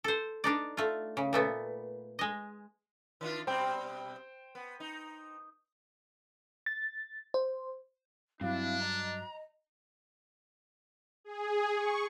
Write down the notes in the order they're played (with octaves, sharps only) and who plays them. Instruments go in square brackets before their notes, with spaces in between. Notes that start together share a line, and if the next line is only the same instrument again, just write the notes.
[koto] A4 C5
D4 D#4 D5
A3 F4
C#3
A#2 A3 B3
G#3 D#5
[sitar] D#3 D4 F4
[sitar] B2 G3 C4 [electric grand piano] C5 G5
[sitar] B3
D#4
[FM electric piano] A6
C5
[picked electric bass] G2 F#3 [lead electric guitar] C4 [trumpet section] D4 [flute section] E4 F5
[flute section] D#5 [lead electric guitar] A#5
[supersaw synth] G#4
C#6